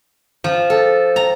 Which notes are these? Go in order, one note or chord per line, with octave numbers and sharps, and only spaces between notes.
F3
A4
A#5